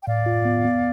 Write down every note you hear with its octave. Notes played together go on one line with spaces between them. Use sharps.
G5
A2 D5 F5
F4
B3
B3